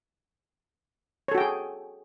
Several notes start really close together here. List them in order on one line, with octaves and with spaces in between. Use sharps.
C#5 A4 F#4 G5 G#4